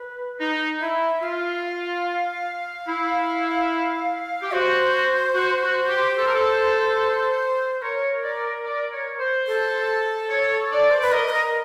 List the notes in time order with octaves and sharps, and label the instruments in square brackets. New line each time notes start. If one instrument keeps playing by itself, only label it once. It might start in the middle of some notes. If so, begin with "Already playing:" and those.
Already playing: [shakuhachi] B4
[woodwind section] D#4
[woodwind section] E4 [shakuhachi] E5
[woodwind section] F4 [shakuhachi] F5
[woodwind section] E4
G4
[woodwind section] F#4 [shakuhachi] C5
[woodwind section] F#4
F#4
G4
A4
A#4
A4
[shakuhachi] A#4 [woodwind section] C#5
[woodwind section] D5
D5
C#5
C5
[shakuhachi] A4
[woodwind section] C#5
D5
[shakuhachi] C5
B4
[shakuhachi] A#4 [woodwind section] D#5
[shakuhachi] B4
A#4